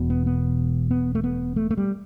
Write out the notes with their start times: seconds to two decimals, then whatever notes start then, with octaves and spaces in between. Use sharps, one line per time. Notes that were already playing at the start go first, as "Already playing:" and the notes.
Already playing: E1 E2 B2
0.10 B3
0.26 B3
0.91 B3
1.15 A3
1.24 B3
1.56 A3
1.71 A3
1.78 G3